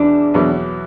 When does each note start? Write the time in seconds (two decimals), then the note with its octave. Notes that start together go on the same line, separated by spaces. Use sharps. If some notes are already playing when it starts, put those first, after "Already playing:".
Already playing: E2 B2 D4
0.34 E2 B2 F#3